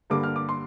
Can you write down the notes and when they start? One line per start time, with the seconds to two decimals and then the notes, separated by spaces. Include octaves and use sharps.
0.10 G2 D3 G3 A#3 D6
0.23 F6
0.36 D6
0.49 C6